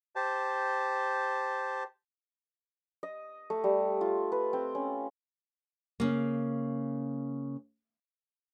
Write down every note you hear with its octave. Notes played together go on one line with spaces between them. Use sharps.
G4 C5 A5
D#5
A3
G3
F4
B4
C4
C#4
C#3 A#3